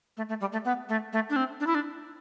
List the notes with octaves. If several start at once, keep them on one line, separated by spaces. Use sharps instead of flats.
A3
A3
G3
A3
B3
A3
A3
D4
C4
D4
E4
D4